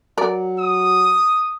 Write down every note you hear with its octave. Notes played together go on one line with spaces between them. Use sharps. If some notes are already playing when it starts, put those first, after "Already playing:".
F#3 A#4 D5
D#6